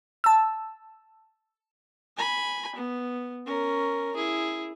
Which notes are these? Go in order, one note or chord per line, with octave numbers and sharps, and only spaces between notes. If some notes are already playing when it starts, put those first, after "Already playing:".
A5 E6
G#5 B5
B3
C#4 A#4
E4 G#4